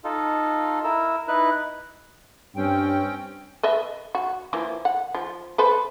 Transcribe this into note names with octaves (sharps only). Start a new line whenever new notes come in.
D#4 F4 A4
E4 A#4 E6
D#4 E4 B4 F#6
G2 C4 C#4 G5
B4 D#5 E5
F#4
E3 F3 A#3
F#5
F3
A4 B4 C5